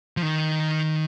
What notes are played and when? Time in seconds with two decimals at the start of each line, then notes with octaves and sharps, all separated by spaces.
0.17 F3
0.22 D#3